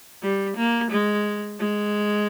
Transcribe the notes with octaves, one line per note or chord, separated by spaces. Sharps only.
G3
A#3
G#3
G#3